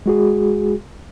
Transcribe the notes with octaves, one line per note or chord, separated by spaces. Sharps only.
G#3 F#4 G#4